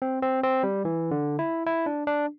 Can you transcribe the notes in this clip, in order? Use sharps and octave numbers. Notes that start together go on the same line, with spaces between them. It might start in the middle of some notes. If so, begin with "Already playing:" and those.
C4
C4
C4
G3
E3
D3
E4
E4
D4
D4